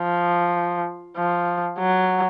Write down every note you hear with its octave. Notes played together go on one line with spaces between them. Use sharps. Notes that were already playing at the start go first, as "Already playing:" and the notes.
Already playing: F3
F3
F#3